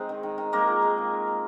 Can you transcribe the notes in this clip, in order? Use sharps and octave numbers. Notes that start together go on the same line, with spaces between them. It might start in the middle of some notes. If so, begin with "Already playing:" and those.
Already playing: G#3 C4 D#4
D#3
D#3
D#3
G#3 A#3 A#4
F4
G#3
D#3
D#3
A#3